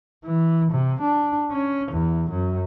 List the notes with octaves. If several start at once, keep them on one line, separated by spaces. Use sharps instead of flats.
E3
C3
D4
C#4
E2
F#2